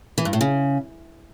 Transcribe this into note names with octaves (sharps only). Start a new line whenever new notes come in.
E3
G2
A2
C#3